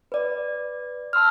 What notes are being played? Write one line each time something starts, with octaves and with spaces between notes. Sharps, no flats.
B4 D5
A5 C6 E6 F6